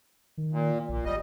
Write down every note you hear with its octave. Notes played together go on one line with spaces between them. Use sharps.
D#3
A#2
A#1 A#2
G#1 G3 D#5